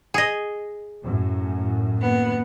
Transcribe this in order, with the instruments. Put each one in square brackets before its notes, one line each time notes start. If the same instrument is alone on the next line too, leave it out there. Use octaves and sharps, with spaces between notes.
[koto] G#4 D#5
[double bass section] F#2 A2
[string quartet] D#2 B3